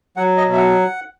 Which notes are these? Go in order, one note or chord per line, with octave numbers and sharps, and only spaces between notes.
F#3 F#5
D#5
B2
E5
F#5